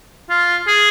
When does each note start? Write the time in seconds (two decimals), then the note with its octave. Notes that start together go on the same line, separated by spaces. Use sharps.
0.30 F4
0.68 G#4